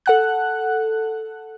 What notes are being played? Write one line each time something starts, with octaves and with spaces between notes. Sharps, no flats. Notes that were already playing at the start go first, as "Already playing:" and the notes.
A4 F#5 F#6